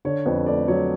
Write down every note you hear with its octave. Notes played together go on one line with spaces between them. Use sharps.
D3 C#5
F2 B4
A3 D5
F#3 C#5